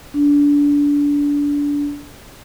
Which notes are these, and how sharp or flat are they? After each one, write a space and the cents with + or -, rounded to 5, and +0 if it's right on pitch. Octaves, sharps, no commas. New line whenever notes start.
D4 -25